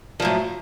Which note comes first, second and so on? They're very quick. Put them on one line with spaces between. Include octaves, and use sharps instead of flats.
F3 F#3 A2